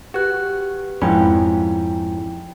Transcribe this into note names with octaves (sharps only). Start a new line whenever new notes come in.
F#4 G4 B4 F#6
F2 G#2 C#4 E4 G5 B5